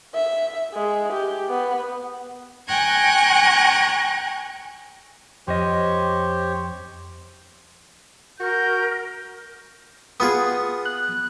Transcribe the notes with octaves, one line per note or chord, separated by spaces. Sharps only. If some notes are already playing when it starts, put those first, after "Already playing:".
E5
G#3
G4
B3
G5 G#5 A#5 C#6 F#6 G#6
F2 G4 C5 C#5 D#5
F#4 A#4 G6
B3 F4 G#4 D#6
F#6